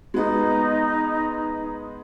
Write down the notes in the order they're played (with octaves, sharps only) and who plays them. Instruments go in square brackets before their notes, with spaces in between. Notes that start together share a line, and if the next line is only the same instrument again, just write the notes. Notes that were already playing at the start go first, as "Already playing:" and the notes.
[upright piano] G#3 B3 [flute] D#4